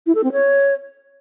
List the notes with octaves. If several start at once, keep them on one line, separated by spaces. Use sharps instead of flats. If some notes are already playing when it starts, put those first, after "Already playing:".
E4
A4
C4
C#5